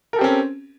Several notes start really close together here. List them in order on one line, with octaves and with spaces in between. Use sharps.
A#4 A4 G4 C4 C#4